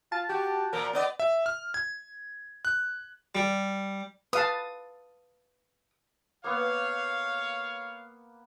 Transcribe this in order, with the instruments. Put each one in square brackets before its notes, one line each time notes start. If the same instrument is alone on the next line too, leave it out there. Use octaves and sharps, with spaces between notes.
[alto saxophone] F4 [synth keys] A5
[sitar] F#4 [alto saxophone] G4
[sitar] A#2 F3 [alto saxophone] A#4
[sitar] B3 D5 D#5
[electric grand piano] E5
F6
G#6
F#6
[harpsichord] G3
[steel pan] B4 F5 A5 [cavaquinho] D#6
[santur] A#3 B3 F#5 [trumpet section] C#5 F5